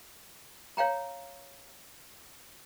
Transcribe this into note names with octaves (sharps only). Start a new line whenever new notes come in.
C#5 F5 G5 A#5